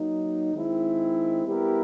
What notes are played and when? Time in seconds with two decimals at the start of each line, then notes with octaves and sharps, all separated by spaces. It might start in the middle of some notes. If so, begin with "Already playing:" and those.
Already playing: F#3 A#3 D#4
0.54 D#3 G#3 C4 E4
1.46 G3 B3 E4 G4 A#4